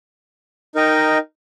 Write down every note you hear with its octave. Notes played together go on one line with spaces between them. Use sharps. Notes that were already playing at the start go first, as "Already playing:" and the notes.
D#4 A#4 D#5 G5